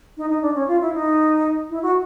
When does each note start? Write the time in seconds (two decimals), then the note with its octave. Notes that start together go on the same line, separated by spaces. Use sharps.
0.17 D#4
0.30 D#4
0.42 D4
0.55 C#4
0.68 F4
0.81 E4
0.94 D#4
1.70 E4
1.83 F#4